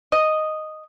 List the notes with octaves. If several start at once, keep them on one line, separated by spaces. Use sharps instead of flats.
D#5